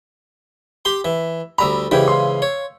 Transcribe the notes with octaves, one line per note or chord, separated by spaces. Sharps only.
G4 C6
E3 E5
D2 G3 A#5 B5 E6
G#2 C#3 E3 E4 G4
F5 C6
C#5